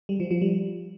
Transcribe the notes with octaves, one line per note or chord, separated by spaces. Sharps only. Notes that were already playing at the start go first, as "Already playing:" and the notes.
G3
F3
F3
G3